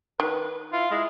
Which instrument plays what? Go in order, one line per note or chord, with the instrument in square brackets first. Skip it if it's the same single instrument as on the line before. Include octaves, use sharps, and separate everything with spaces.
[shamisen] D#3 [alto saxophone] B4
[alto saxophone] E4 [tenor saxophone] F4
[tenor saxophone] G#3 [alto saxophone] E4